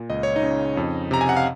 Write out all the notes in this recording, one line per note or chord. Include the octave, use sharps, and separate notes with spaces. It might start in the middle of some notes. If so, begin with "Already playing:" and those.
Already playing: A#2
C#2 D#5
C#5
D#4 D#5
C#3
F2
C3 A#5
G#5
F#5
F5